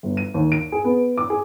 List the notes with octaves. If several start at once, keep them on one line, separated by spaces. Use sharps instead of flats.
G1
D#7
D#2
D7
G#4
B3
D6
G#4